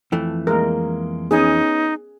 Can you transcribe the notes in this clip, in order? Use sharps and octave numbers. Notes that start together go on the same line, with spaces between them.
F2 E3 A3
G#3 A#3 A#4
B3 C#4 D#4 G#4